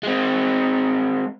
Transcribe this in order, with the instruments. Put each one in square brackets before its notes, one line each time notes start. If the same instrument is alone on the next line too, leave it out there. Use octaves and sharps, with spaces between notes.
[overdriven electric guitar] G#3 C4